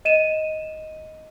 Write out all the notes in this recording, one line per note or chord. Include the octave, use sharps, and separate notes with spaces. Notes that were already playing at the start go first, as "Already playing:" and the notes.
D#5 D#7 E7